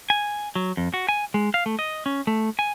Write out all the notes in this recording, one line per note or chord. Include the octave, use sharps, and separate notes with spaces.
G#5
F#3
F2
F#4
G#5
G#3
F5
A3
D#5
C#4
A3
G#5